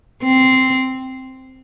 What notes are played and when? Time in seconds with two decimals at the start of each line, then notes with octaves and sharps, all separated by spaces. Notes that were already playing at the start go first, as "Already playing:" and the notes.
0.23 C4